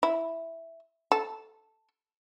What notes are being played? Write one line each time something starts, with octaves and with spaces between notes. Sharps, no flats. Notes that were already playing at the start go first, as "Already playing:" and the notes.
E4
A4